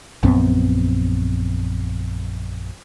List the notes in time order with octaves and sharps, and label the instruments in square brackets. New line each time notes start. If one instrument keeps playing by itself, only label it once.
[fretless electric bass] A#1 F#2 B3 C4